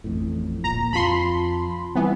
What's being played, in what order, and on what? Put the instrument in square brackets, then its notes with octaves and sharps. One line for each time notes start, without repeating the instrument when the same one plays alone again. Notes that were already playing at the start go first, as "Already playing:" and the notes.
[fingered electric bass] A1 F2 A2
[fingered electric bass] D1 A#2 [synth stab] A#5
[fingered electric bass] F2 [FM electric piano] F4 A5 [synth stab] B5 C6
[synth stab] E3 B3 [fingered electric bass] G3 C4